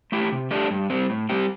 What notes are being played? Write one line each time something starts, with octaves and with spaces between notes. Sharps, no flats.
A3 E4 G4
C3
A3 D4 G4
G2
G3 C4
A2
G3 C4 G4